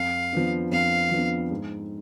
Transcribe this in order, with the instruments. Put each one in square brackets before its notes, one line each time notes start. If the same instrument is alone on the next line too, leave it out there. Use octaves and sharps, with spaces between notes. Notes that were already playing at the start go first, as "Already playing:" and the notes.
Already playing: [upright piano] F2 [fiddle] F5
[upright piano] F3 B3 D4
[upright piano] F2 [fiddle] F5
[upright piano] F3 B3 D4
G#2